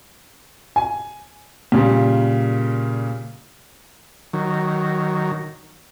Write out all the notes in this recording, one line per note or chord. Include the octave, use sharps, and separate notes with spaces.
G#5
A#2 C#3 G3
D#3 F#3